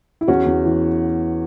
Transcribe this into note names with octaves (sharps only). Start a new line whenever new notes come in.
E4
E2 C#4 F#4
E2
E3